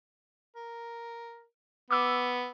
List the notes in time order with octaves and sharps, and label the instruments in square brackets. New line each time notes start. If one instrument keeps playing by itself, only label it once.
[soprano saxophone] A#4
[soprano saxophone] B3 [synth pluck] D6 E6